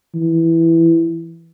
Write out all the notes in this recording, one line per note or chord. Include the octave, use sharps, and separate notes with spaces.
E3